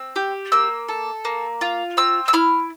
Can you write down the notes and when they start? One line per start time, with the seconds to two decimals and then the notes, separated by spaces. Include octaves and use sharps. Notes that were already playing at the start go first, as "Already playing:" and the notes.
Already playing: C4 E6
0.16 G4
0.52 A#3 E6
0.88 A4
1.25 A#3
1.61 F4
1.97 C4 E6
2.28 E6
2.33 E4 F6